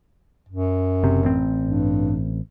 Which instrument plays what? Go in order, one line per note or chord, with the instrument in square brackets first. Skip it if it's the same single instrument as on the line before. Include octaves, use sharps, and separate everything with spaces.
[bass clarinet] F#2
[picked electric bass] F#1 C3
A1 C4
[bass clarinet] G2